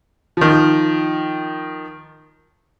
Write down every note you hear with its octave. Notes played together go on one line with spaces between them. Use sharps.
D#3 F3